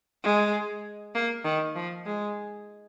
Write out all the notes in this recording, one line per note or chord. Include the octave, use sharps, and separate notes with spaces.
G#3
A#3
D#3
F3
G#3